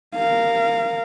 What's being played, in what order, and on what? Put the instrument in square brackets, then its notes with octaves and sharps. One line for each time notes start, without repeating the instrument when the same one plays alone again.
[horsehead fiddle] A#4 F5